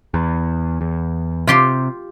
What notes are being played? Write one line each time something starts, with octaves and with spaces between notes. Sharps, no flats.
E2
E2
C3 F4 G4 C6